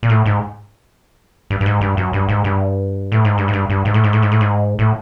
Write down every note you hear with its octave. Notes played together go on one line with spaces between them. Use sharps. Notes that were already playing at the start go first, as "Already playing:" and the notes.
A#2
A2
G#2
G2
G2
G#2
G2
F#2
G2
G#2
G2
A2
G#2
G2
G#2
G2
G2
G#2
A2
G#2
A2
G#2
A2
G#2
A2